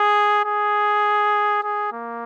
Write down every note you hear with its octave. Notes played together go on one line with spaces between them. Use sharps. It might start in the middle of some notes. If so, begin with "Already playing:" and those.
Already playing: G#4
G#4
G#4
A#3